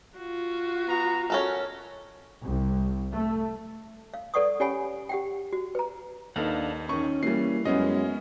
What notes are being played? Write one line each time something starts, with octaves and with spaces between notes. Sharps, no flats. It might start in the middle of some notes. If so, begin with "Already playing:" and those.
F4 F#4
B3 A#5
C#4 F#4 A4 A#4
C2
A3
F5
A4 B4 D5 F#5 C#6 D#6
C#4 G4 C#5 F#5 G#5 B5
G4 F#5 G5
F#4
B4 A#5
D#2 D4 D#4 A4 B4 F5 F#5
D#3 C#4 C#6
E3 G3 A#3 C7
F#2 G#3 B3 C#4 D#5